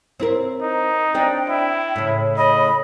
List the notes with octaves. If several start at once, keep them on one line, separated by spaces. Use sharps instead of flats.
C4 E4 A#4
D#4
C4 D4 G5
E4
A2 C#3
D#5 B5